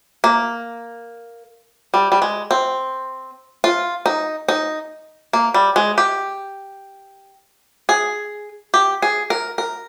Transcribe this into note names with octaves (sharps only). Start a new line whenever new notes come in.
A#3
G3
G3
G#3
C4
F4
D#4
D#4
A#3
G3
G#3
G4
G#4
G4
G#4
A#4
A#4